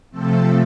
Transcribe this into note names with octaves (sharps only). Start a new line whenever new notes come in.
C3 F3 A3 C4 A4